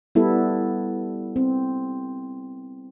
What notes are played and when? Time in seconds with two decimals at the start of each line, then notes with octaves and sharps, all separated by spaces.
0.15 G3 B3 E4 A4
1.36 C4